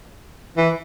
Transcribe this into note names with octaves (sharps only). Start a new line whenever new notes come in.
E3